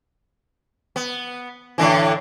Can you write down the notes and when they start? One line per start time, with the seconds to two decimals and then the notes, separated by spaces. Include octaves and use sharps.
0.96 B3
1.78 A2 D3 E3